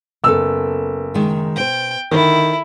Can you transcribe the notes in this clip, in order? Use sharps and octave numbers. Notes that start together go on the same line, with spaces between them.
F#1 B3 A4 E6
D#3 G#3
B2 C5 G5
D3 D#3 E4